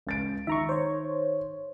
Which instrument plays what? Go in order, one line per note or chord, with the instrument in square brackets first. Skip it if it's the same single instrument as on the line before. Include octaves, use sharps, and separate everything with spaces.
[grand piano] C#2 A6 D7
[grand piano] D#3 [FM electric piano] E5 A#5 C#6
[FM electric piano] C5 C#5